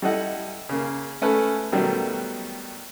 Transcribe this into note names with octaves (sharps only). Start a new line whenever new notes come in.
G3 E4 A4 D#5 F#5
C#3 A#3
A3 C#4 A4 B4
B2 D#3 F#3 G3 A3 B3